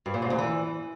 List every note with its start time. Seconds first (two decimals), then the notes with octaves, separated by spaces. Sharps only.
0.06 G2
0.14 A#2
0.22 G#2
0.30 E2
0.38 E3